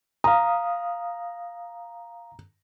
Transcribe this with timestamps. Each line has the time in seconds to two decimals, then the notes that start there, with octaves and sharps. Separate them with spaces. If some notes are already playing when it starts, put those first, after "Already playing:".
0.24 F5 A#5 D#6